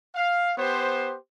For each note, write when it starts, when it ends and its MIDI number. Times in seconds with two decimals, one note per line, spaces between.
0.15 0.53 77
0.58 1.17 59
0.58 1.17 67
0.58 1.17 72